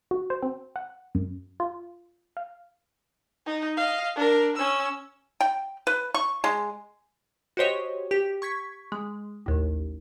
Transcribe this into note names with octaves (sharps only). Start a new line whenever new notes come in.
F#4
C5
C4
F#5
F#2
F4
F5
D#4
D#5 F5
D4 A#4
C#4 E6
G5
B4
C#6
G#3
F#4 G4 C5 C#5 D#5
G4
C#6 G#6 B6
G#3
A1 D#2